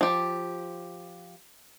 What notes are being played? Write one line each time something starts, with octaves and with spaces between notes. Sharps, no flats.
F3 G4